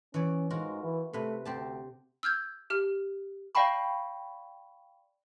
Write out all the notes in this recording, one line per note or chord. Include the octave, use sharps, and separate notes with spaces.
E3 C#4 C#5 D5
G#2 F4 F#4 A#4
E3
C3 A3 B4
D2 C4 G4 A5
E6 F6 G6 G#6
G4 F6
D5 F5 G5 A5 B5 C#6